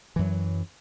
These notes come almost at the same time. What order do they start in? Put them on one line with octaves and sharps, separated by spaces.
E3 F#2 F#3